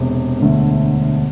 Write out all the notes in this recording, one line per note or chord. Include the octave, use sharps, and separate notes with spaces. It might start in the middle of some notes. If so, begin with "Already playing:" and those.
Already playing: E1 E2 C3
E1 D2 D3 A3